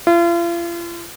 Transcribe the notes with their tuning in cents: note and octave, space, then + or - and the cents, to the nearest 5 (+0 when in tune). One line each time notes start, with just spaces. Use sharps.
F4 -40